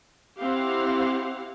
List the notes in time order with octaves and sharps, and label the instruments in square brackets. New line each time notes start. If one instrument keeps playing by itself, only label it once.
[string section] C4 E4 G4 F5 F#5